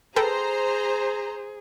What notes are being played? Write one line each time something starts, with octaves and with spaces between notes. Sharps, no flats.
G#4 A4 B4 C5 G5 A#5